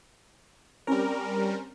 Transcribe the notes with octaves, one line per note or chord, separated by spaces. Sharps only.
G3 C4 C#4 A#4